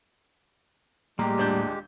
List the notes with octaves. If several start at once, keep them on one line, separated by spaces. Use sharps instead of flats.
A2 G3 G#3 A#3 G4 A#5
D#1 D4 G6